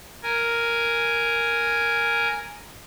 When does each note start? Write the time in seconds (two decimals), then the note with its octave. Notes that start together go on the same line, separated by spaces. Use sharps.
0.23 A#4 G#5